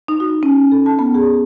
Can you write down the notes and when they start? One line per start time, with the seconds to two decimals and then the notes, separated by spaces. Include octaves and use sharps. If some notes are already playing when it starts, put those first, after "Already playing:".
0.08 D#4
0.20 F#4
0.43 C#4
0.71 A4
0.86 A5
0.99 B3
1.15 G#4